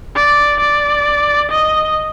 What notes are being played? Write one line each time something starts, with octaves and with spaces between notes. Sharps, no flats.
D5
D5
D#5